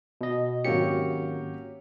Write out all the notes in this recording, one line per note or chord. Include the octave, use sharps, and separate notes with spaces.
B2 D#5
G#1 F#3 A#3 C#4 G4 C#7